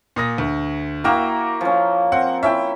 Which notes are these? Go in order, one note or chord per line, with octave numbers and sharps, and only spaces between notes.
A#2 D#6 A#6
D2
A#3 E4 F#4 A#4 G5 A#5
F3 C#4
C4 F#5
C#4 E4 E5 G5